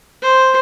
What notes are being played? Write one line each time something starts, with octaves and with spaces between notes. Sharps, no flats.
C5